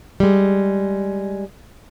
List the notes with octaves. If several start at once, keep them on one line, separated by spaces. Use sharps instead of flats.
G3 G#3